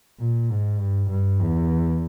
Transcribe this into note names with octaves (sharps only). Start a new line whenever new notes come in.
A#2
G#2
G2
G2
E2